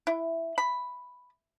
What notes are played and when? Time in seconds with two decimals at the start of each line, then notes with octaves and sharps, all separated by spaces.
0.07 E4
0.58 B5